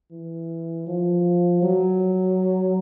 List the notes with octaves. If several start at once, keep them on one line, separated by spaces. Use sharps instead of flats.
E3
F3
F#3